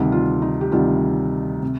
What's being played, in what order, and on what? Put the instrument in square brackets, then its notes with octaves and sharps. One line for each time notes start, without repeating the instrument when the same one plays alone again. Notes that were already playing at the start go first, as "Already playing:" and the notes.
Already playing: [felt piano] D2 C3 D#3 G3
F4
D#4
G4
D2 C3 D#3 G3 F4
C3